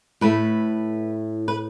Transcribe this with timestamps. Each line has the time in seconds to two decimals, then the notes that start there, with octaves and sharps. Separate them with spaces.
0.21 A2 A3 B4
1.48 B4